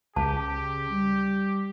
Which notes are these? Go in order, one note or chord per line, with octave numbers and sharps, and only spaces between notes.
C#2 C#3 G4 A5
G3